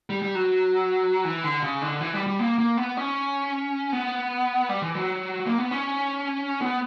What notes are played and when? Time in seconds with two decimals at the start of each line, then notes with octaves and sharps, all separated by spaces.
0.10 G3
0.22 G3
0.35 F#3
1.24 E3
1.44 D3
1.63 C#3
1.82 D3
2.01 E3
2.13 G3
2.27 G3
2.39 A#3
2.58 A#3
2.77 B3
2.97 C#4
3.93 B3
4.69 G3
4.82 E3
4.95 F#3
5.46 A#3
5.58 B3
5.71 C#4
6.61 B3